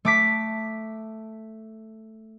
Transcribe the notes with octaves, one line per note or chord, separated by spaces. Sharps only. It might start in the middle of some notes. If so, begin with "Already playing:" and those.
A3 D6 B6